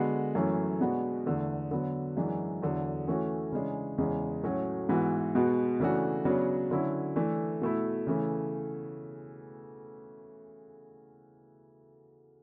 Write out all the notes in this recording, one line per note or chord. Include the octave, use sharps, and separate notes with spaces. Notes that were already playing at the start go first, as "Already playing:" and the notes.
Already playing: D3 G#3 B3 F#4
F#2 E3 A3 C#4
B2 G#3 B3 D4 F#4
E2 D3 A3
D3 F#3 B3
F#2 E3 G#3 D4 F#4
E2 D3 F#3
E3 A3 C#4 F#4
C#3 E3 G#3 D4
E2 C#3 G#3
A2 F#3 A3 C#4 F#4
G#2 E3 B3 F#4
B2 G#3 B3 F#4
C#3 E3 A3 D4 F#4
C#3 F#3 B3 D4 F#4
D3 F#3 C#4 E4
E3 A3 D4
B2 A3 E4
C#3 E3 A3